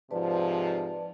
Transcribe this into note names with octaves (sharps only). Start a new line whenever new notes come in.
G#2 C3 F3 B4 D5 A5